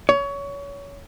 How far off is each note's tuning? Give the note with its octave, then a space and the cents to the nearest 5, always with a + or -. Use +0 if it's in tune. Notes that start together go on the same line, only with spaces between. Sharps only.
C#5 +25